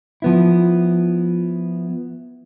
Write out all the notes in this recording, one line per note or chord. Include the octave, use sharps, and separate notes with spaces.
F3 B3 E4